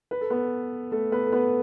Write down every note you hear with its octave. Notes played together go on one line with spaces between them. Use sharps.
B4
A4
B3 B4
A3 A4
B3 B4
A4
B3 B4